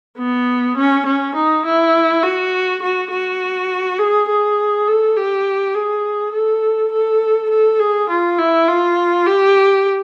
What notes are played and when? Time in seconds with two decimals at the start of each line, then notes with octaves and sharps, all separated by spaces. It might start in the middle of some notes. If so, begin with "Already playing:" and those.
0.18 B3
0.77 C#4
1.06 C#4
1.35 D#4
1.65 E4
2.23 F#4
2.82 F#4
3.11 F#4
3.99 G#4
4.29 G#4
4.88 A4
5.17 G4
5.74 G#4
6.33 A4
6.92 A4
7.50 A4
7.79 G#4
8.09 F4
8.38 E4
8.68 F4
9.26 G4